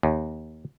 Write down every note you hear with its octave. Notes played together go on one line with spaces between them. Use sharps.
D#2